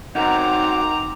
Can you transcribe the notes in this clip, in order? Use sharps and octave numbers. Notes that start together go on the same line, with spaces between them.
C4 D#4 F#4 A#4 F#5 A#5 D6